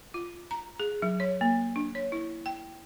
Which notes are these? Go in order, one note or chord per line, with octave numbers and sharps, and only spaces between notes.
F4
A#5
G#4
F#3
C#5
A#3
D4
C#5
E4
G5